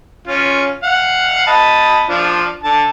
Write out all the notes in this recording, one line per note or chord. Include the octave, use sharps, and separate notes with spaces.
C#4 F4
F5 F#5
D#5 A5 B5
F3 D4 F4
D3 A5